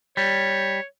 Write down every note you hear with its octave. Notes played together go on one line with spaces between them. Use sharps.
G3 C#5